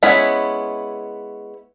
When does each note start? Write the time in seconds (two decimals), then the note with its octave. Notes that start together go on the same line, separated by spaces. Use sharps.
0.03 G#3 B3 C#4 E4 B4